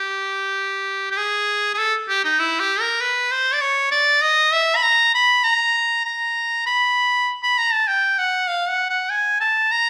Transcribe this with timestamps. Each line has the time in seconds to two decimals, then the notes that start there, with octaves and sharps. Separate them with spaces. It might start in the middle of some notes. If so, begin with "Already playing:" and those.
Already playing: G4
1.11 G4
1.17 G#4
1.74 G#4
1.78 A4
2.09 G4
2.25 D#4
2.40 E4
2.60 G4
2.81 A#4
3.01 B4
3.32 C5
3.54 D5
3.61 C#5
3.91 D5
4.22 D#5
4.54 E5
4.76 B5
4.83 A#5
5.15 B5
5.44 A#5
6.05 A#5
6.66 B5
7.43 B5
7.58 A#5
7.73 A5
7.88 G5
8.19 F#5
8.49 F5
8.69 F#5
8.90 F#5
9.10 G#5
9.41 A5
9.72 A#5